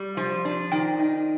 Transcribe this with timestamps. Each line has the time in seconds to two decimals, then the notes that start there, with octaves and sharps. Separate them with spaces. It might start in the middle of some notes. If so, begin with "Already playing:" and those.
Already playing: G3
0.17 F3
0.45 D4
0.72 D#3 G5
0.99 D#4